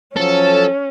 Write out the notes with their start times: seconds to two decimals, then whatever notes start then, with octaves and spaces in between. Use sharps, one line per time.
0.17 F3 F#3 C#4 A4